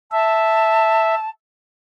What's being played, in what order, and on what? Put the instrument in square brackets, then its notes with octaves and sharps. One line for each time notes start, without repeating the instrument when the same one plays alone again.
[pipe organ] E5 [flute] A5